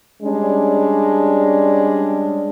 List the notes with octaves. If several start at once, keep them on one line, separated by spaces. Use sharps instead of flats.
G3 G#3 C#4 D4